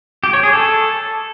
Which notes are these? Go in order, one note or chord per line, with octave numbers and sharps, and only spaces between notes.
G4
C#5
G#4
A4